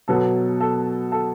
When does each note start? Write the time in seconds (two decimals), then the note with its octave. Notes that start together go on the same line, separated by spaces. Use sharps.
0.08 B2 F#3 B3 A4
0.61 A4
1.12 A4